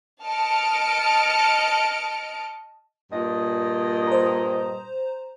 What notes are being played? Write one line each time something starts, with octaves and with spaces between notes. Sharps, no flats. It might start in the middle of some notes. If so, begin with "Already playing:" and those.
D#5 A5 F6 C#7 D7
G2 A#2 D#5
C5 A#5